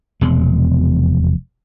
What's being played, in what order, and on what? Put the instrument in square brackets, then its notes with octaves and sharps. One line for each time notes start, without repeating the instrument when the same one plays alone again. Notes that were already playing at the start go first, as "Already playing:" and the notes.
[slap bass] F1 E2 B2 G#3